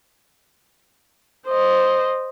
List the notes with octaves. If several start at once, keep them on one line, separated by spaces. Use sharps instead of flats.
C5 D#5